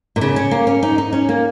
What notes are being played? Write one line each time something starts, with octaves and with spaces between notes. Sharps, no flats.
A#2
C#3
C#4
A#3
C#4
D#4
D#4
C#4
A#3